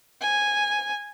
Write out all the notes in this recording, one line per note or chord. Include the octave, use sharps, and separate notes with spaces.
G#5